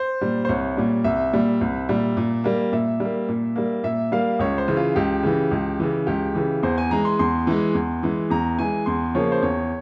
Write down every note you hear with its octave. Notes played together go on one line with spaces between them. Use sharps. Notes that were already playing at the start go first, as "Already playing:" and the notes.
Already playing: C5
A#2 G3
C5
C2 C#5
A#2 G3
C2 E5
A#2 G3
C2
A#2 G3
A#2
G3 A#3
A#2 E5
G3 A#3
A#2
G3 A#3
A#2 E5
G3 A#3 F5
C#2 C#5
C5
C#3 E3
F4
C#2 G4
C#3 E3
C#2
C#3 E3
C#2 G4
C#3 E3
E2 C5
G#5
E3 G#3 A#5
C6
E2 C6
E3 G#3
E2
E3 G#3
E2 A#5
E3 G#3 G#5
E2 C6
C#3 F3 A#3 C#5
C5
E2 C#5